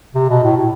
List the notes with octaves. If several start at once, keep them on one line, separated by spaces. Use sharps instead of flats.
C3
B2
A2
A2